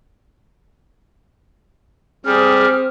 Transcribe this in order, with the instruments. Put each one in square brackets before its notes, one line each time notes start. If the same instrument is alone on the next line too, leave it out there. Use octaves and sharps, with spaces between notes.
[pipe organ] G3 [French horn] C4 [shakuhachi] G#4 [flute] F6